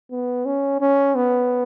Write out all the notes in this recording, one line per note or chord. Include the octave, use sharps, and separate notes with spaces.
B3
C#4
C#4
B3